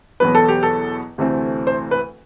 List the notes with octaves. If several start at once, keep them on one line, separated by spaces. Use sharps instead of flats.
E2 B2 F#3 B3 B4
A4
G4
A4
D2 C3 E3 A3 C4
C5
B4